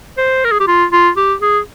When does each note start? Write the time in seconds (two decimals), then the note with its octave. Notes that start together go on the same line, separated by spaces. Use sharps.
0.18 C5
0.44 A#4
0.51 G#4
0.60 G4
0.67 F4
0.92 F4
1.17 G4
1.42 G#4